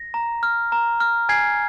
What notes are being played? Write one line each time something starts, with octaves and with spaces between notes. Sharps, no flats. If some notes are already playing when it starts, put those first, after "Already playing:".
Already playing: A#6
A#5
F6
A#5
F6
G#5 G#6 C7